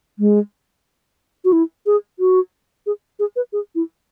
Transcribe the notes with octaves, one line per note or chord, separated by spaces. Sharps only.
G#3
F#4
E4
G#4
F#4
G#4
G#4
B4
G#4
E4